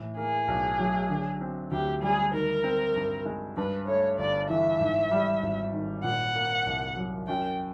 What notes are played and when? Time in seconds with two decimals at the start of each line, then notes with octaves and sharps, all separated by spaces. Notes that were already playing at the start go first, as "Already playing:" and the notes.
Already playing: A2 E3
0.17 A#3 G#4
0.48 B1
0.79 F#3
1.10 D3
1.41 C4
1.71 D2 G4
2.02 G3 G#4
2.33 D#3 A#4
2.64 C4
2.96 G2
3.26 G#3
3.57 G2 B4
3.87 A3 C#5
4.19 G1 D5
4.49 E3 E5
4.80 G#2
5.11 G3
5.43 G#1
5.73 D#3
6.04 A#2 F#5
6.35 A#3
6.66 C2
6.97 F#3
7.28 F#2 G5